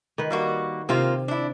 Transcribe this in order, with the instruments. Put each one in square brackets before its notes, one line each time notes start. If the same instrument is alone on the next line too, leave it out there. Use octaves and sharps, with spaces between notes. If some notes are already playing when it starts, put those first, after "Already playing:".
[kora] D#3 B4
[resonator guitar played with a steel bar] G3 A#3 F#4
[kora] C3 [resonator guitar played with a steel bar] A#3 C4 F4
[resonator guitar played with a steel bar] D4 E4